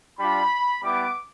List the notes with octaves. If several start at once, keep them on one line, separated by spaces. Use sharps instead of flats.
G3 D4 F4 B5
G3 B3 E4 D6